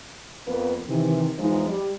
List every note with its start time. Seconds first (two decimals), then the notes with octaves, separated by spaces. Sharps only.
0.47 F2 A#3 B3 A#4 B4
0.88 C3 D#3 E3
1.39 E2 F3 G#3 D#4
1.68 G3